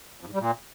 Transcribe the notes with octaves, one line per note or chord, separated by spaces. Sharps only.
F2
G#2
G3
A#2